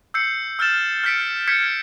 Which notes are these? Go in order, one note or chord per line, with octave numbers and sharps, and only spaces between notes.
E6 G6 C7 C#7
E6 F6 G6 A6 E7
F6 G6 A6 B6 C#7 D7
F6 G6 G#6 B6 C#7